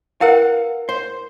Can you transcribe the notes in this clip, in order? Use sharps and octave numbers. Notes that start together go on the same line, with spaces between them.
E4 A#4 B4 F5 F#5
C5